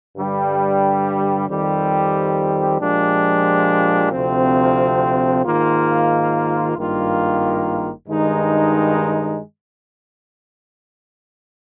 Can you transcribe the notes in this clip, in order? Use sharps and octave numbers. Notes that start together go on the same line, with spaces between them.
G2 D3 G3
F2 D#3 G3 C4 G4
A#2 F3 G#3 D4 G4
D2 C3 F3 C4
G#2 D#3 A#3 F4
G#1 G2 D#3 A#3 F4
G2 D#3 G#3 D#4